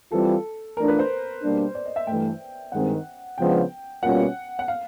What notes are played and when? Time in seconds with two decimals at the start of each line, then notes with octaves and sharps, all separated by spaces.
0.11 E3 G3 C4 F4 A4
0.76 E3 A3 D4 F4 A#4
0.88 B4
0.99 C5
1.42 B2 G3 A#3 D4
1.75 D5
1.85 D#5
1.96 E5
2.07 G2 E3 A3 G5
2.72 G2 D#3 G#3 C4 F#5
3.38 C#3 F3 G#3 B3 D4 G5
4.03 B2 G3 A#3 C#4 F4 F#5
4.59 F#5
4.68 F5